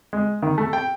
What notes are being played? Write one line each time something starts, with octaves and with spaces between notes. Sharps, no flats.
G#3
D#3
A3
G5